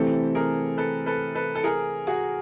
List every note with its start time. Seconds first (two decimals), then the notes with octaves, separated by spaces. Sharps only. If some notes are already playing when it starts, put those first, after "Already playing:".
Already playing: C3 E3 A3 C4 G4 A4
0.35 G#4 A#4
0.77 A4 B4
1.06 A4 B4
1.35 A4 B4
1.55 A4
1.64 G#4 A#4
2.07 F#4 G#4